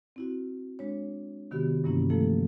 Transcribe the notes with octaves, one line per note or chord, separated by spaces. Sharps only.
C4 E4 F#4
G#3 D4 C#5
C3 D#3 B3 F#4 G4
G2 C3 E3 A#3 C#4 E4
F3 A3 A#3 E4 A4